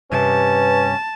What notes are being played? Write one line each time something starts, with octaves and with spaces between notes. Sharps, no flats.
G2 C3 C#4 B4 A5